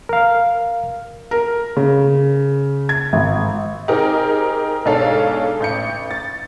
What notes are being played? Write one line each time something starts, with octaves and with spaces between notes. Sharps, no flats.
A#4 F5
A#4
C#3
G#6
G#1
C4 D#4 G4 G#4 A#4
B1 G#2 D4 A4 C#5 F5
A1 G6 C#7
A6